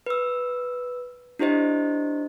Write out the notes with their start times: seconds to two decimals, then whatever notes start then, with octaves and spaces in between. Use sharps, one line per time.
0.06 B4 E6
1.39 D4 E4 G4 C5 D#5